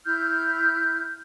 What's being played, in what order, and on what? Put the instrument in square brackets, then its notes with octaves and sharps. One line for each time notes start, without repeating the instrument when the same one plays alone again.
[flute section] E4 F6 G6